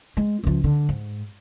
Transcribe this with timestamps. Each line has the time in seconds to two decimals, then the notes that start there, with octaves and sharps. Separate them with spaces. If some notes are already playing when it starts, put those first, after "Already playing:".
0.17 G#3
0.44 C#2 F3
0.64 D3
0.89 G#2